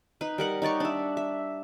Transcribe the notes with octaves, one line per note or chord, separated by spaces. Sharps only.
D#4 B4
G3 A#4 F#5
D#4 C#5 D5 C#6
D4 E5
E5